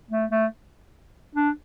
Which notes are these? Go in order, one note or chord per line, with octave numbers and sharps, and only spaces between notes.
A3
A3
D4